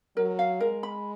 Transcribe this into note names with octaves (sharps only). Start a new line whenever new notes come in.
F#3 A#4
F5
G#3 A#4
B5